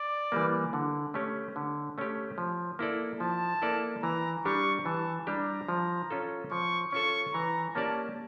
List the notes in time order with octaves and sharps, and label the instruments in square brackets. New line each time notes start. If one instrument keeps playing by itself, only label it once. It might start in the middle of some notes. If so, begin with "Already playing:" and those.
Already playing: [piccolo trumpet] D5
[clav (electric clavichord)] E3 G3 A#3
D3
A3 C#4 G4
D3
A3 C#4 G4
F3
A#3 E4 A4 D5
[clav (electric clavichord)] F3 [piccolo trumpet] A5
[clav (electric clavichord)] A#3 E4 A4 D5
[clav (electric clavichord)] E3 [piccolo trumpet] A#5
[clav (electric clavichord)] G3 D4 G4 [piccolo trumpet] C#6
[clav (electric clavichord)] E3 [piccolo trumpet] A5
[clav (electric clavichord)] G3 D4 G4 [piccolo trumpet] A#5
[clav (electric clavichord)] F3
C#4 F4 A4
[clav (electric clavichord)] F3 [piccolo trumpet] C#6
[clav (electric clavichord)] C#4 F4 A4 [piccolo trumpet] C#6
[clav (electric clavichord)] E3 [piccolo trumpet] A#5
[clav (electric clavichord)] A#3 C#4 G4 D5 [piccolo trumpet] A5